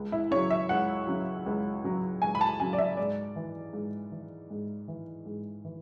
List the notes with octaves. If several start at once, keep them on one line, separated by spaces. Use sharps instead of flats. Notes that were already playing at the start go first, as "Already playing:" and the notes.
Already playing: C#2
E4
C#3 F#3 C#5
E5
C#2 F#5
C#3 F#3
C#2
C#3 F#3
C#2 G#5
B5
A5
C#3 F#3 G#5
D5
E5
G#2 D5
E3
G#2
E3
G#2
E3
G#2
E3